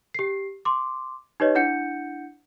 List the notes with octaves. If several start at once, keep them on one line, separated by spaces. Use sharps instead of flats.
G4 C7
C6 D6
D#4 G4 B4 C#5 D#5
D4 E4 F#5 G6 C#7